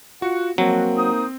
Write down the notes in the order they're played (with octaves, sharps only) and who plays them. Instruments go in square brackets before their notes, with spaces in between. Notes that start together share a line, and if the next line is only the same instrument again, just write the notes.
[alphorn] F4 [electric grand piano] F#4 [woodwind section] F#5
[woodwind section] F3 G#3 F#4 [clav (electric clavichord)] F#3 [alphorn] A#3 [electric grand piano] C4
[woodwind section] D#4 C5 D#6